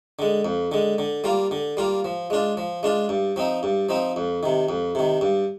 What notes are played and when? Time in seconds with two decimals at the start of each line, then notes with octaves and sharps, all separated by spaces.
0.19 D3 G#3
0.45 F2
0.72 D3 G#3
0.98 D3
1.24 G3 A#3 F4
1.51 D3
1.77 G3 A#3 F4
2.05 F3
2.30 G#3 D4 F4
2.57 F3
2.83 G#3 D4 F4
3.09 G2
3.36 F3 C4 D#4
3.63 G2
3.89 F3 C4 D#4
4.16 F2
4.43 C3 D#3
4.69 F2
4.95 C3 D#3
5.21 G2